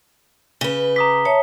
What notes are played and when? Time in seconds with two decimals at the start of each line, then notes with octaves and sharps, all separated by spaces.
0.61 C#3 B4 G7
0.96 A#5 D6 D#6 B6
1.25 C#5 E5 A5